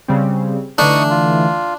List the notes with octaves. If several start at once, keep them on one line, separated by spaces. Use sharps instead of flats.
C#3 G3 C4
D3 E3 A3 D4 D#4 C#6 D#6
F4